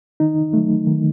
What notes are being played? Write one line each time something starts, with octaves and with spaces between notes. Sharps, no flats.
D#3 D#4
F#3 A3
D#3